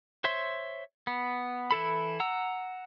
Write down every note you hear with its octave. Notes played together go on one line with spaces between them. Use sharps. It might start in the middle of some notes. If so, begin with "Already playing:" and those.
C5 C#5 E5 C6
B3
E3 E4 A4 B5
F#5 A#5 E6